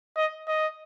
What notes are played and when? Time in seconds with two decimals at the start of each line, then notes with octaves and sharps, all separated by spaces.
0.17 D#5
0.48 D#5